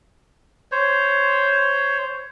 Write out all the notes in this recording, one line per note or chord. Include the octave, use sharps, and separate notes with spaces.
C5 C#5